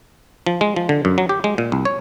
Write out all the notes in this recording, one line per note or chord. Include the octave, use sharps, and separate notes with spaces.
F3
G#3
F3
D3
F#2
F#3
G4
G#3
A#2
C2
C#5